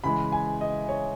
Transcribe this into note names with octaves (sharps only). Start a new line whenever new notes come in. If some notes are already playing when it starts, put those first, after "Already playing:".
C#3 E3 G#3 B5
G#5
D#5
C#5